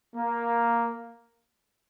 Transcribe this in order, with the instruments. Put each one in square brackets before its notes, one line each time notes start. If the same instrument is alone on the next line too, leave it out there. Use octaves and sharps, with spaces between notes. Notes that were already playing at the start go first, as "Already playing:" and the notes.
[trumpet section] A#3